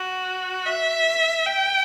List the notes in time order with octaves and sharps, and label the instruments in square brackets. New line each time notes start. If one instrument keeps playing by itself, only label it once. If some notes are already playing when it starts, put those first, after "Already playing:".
Already playing: [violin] F#4
E5
G5